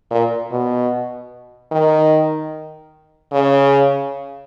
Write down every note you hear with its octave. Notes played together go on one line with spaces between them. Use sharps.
A#2
B2
D#3
C#3